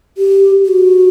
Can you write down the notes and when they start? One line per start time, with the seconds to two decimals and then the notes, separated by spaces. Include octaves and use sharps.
0.17 G4
0.65 G4
0.68 F#4